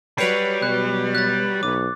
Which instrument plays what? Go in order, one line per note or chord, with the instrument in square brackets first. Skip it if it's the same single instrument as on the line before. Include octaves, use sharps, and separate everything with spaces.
[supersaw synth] F#3 B4 C#5 [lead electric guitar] G3 [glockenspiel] C7 C#7 F7
[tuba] B2 [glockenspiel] F#6
[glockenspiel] F#6 A6
[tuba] B1 [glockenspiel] D6